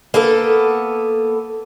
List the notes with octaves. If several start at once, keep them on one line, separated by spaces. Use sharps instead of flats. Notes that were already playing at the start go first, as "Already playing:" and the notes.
A#3 B3 A4